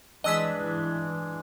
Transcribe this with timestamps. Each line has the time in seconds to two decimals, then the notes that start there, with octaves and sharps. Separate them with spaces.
0.24 E3 G#3 D4 D#5 E6 B6